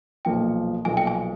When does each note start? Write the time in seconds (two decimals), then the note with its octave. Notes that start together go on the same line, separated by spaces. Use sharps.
0.25 B1 A#2 F3 A#3 G5
0.85 B1 A#2 F3 A#3 G#5
0.97 G5
1.07 G#5